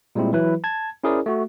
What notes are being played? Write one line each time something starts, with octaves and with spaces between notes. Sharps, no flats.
A#2 G3 G#3 C4 E4
E3 F#3 E4 B4
A5 G#6
C#4 E4 G#4 A#4 C5 D5
A3 F#4